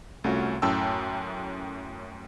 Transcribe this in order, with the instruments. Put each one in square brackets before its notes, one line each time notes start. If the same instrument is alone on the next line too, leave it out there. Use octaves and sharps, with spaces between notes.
[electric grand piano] C2 A3 C#4 F4 F#4 C#5
F#2 A2 C#4 G5 A5 E6